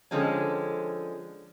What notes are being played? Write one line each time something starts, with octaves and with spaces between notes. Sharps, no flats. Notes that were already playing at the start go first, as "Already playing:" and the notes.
D3 F3 G#3 C4 C#4